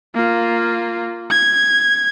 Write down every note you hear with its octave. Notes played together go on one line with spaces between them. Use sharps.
A#3 F4
G#6